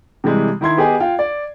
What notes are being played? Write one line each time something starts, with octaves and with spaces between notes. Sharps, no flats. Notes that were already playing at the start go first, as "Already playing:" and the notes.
C3 E3 G3 G#3
D#3 E4 C6 G#6
B3 G4 G#4 D#5 G#5
F4 F5 G5
D5